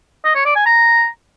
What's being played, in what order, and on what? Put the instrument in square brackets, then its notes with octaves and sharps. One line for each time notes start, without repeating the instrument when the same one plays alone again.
[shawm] D#5
C#5
D5
G#5
A#5